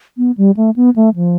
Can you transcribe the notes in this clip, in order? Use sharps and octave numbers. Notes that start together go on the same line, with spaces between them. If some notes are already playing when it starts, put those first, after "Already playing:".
B3
G3
A3
B3
A3
F3